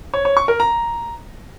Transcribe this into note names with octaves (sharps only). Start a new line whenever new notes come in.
C#5
C#5
C#6
A#4
A#5